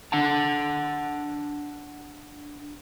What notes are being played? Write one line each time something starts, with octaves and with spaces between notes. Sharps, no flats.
D4 F#5 A5